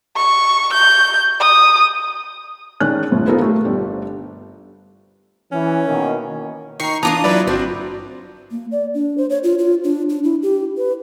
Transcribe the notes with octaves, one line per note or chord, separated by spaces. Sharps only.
C#6
G6
D#6
D#3 G#3 C#4 D4 F#6
G1 C#2 A2
B3 D#4 F4 A4 A#4 C5
A3 G4 A4
G1 D4 G4
E3 C#4
B2 D#3 A#3
D#3 D#4 A#5 C#6 C7
E3 D4 F4 A5 A#5 D6 D#6
F#3 E4 B4 D5
G1 C4 D4 F#4 C5 D5
A#3
D5
D4
C5
C#5
F4
F4
D4
D4
E4
G4
B4